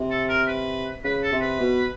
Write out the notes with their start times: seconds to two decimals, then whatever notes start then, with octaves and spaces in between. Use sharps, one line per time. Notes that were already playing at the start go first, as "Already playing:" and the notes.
Already playing: C3
0.10 A4
0.29 A#4
0.48 B4
1.04 C#3 B4
1.23 A4
1.32 C3
1.41 B4
1.60 B2